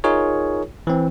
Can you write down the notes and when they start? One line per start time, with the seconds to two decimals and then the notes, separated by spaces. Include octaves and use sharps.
0.04 D#4 F4 G#4 A#4 C#5
0.87 E3 C4